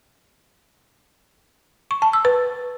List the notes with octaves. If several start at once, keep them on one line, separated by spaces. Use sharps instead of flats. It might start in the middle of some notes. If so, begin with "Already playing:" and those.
C#6
A5
E6
B4